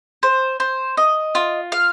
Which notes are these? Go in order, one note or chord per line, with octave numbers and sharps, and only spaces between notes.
C5
C5
D#5
F4
F5